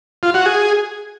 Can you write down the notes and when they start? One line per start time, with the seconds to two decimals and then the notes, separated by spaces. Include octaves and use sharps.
0.23 F4
0.34 F#4
0.46 G#4